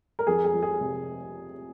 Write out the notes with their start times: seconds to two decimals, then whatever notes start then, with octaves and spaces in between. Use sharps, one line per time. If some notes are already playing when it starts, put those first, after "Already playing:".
0.19 A#4
0.27 F2 G#4
0.44 G#4
0.53 F3
0.63 G#4
0.81 C3